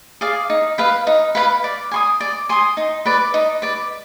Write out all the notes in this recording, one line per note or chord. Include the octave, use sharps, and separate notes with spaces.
G#4 D5 F5
D#4
B4 F5 B5
D#4
B4 F5 B5
D5
G#5 C6 D#6
D5
G#5 C6 D#6
D#4
B4 D5
D#4
B4 D5